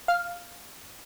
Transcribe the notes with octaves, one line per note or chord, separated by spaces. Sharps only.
F5